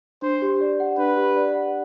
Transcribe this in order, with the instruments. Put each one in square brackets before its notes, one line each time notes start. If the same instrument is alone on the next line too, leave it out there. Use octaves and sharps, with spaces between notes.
[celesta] D4 [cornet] C5
[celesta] G4
D5
F#5
[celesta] D4 [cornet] B4
[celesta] G4
D5
F#5